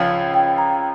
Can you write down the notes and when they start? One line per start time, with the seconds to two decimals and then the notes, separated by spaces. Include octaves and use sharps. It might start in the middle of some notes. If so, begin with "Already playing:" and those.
Already playing: C#2 C#3 F3 C#4 F5
0.34 G5
0.58 A#5